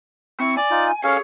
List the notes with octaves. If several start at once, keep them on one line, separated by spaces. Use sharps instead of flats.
C4 E4 C#6
D5 G#5
D#4 F4
C#4 G#4 A4 C#5 F5